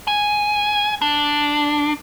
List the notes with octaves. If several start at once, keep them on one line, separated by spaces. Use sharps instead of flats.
G#5
D4